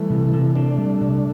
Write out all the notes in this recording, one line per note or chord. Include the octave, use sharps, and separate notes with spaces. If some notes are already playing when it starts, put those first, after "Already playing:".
Already playing: E3 G3 A3
C3
C3
A3 C4 D4
G3
C3